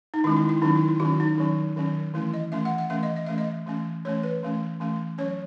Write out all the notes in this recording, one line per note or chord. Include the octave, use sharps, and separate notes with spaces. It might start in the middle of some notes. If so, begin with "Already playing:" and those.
D#4
D#3 G#3 C#4 E4
E4
E4
D#3 F#3 C#4 D#4
E4
E4
D#3 F#3 C#4 F#4
D#4
D#3 F#3 C#4
D#3 F#3 C#4
E3 A3 C#4 E4
D#5
E3 A3 C#4 E5
F#5
F#5
E3 A3 C#4 E5
D#5
D#5
E3 A3 C#4 E5
D#5
E3 A3 C#4
E3 A3 C#4 C#5
B4
E3 A3 C#4
E3 A3 C#4
F#3 C#4 C#5